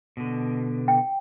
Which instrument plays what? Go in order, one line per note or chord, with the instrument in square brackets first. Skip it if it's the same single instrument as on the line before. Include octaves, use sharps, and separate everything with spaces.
[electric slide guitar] B2 D3
[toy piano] G5